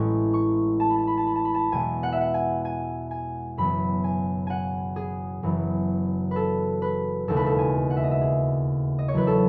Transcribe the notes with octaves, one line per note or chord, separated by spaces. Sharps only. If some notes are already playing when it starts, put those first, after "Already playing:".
Already playing: A1 A2 G#3 C#4 C#6
C#6
A5
B5
A5
B5
A5
B5
A5
B5
A5
E2 B2 G#3 G#5
F#5
E5
F#5
G#5
G#5
G#5
F#1 F#2 E3 B3 B5
G#5
F#5 G#5
G#4
F#1 F#2 E3 B3
A4 B4
B4
E1 D#2 C#3 G#3 A4
B4
A4
G#5
F#5
E5
D#5
E5
G#4
D#5
C#5
E2 D#3 F#3 B4
A4